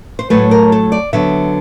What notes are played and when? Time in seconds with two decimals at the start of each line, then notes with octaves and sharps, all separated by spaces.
0.19 C5
0.30 A2 F#3 A3 B4
0.51 A#4
0.72 A4
0.92 D5
1.13 D3 F#3 B3 E5